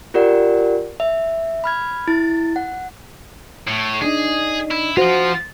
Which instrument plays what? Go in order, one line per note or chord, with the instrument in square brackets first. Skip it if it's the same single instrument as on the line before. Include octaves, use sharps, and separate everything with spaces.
[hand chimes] F4 G4 A#4 D5 F#5
E5
B5 F6 G#6
E4 A6
F#5
[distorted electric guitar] A2
[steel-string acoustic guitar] D4 D#4 [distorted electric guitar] G#4
[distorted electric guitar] E4
[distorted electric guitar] F3 F4 [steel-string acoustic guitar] F#4 C5